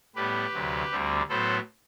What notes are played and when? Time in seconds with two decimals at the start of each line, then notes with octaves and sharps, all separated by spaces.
0.15 A2 G3 B3 G4 B4
0.53 D2 C3 F#3
0.92 D2 D3 G3 C4
1.29 A2 F#3 B3 A4 C5